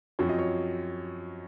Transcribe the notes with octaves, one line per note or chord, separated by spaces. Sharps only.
F#2 F3 C4 C#5
D#5
C#5